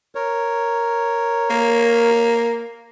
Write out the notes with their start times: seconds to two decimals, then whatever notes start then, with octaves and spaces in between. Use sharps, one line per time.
0.15 A#4 C#5
1.50 A#3